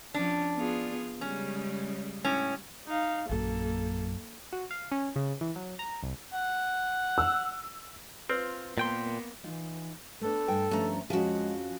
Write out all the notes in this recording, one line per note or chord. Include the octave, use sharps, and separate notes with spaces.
F3 C#4 D4
B3 F4 G#4
C#3 G3 G#3 C#4
A2 C#4
D#4 F5
A#1 F#2 A#3 A4
F#4
F5
C#4
C#3
E3
F#3
A#5
C2
F#5
E6
C4 F4 B4
A#2 A#3 B3 G5 C6
E3 D#4 F4
A3 B3 D4 A4
G2 G5 G#5
G2 F3 A3 C#4 A#5
F2 F3 G#3 C#4 F#4 G#4